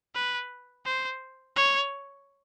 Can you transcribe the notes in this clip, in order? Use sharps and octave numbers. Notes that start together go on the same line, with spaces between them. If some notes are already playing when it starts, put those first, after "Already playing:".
B4
C5
C#5